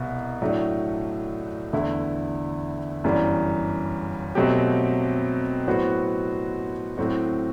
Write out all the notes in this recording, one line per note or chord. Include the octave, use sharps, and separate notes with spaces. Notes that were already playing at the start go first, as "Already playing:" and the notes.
Already playing: C2 B2 E4
A2 F#3 A3 D4
E2 D3 A3 E4
G1 F#2 E3 G3
B2 F#3 A3 C4 G4
A2 F#3 B3 F#4 C5
A2 F#3 C4 F#4